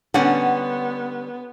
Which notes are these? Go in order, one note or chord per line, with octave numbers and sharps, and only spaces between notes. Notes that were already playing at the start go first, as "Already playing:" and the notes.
D3 G3 B3 C#4 F#5